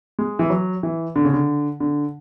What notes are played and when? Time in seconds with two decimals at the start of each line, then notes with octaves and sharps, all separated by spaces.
0.19 G#3
0.39 E3
0.50 F#3
0.83 E3
1.16 D3
1.25 C#3
1.33 D3
1.80 D3